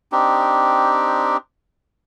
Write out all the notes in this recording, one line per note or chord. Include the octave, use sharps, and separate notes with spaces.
C4 D4 D#4 G4